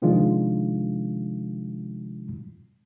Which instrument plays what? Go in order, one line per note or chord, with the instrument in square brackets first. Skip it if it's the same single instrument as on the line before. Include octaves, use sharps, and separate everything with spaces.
[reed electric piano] C3 D#3 F3 G#3 D4 F4